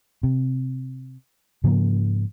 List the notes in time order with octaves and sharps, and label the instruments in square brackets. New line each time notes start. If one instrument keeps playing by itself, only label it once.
[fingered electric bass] C3
G#2 C#3 F3 A#3